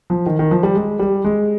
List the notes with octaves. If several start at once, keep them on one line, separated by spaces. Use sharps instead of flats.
F3
D#3
D#3
F3
G3
G#3
G3
G#3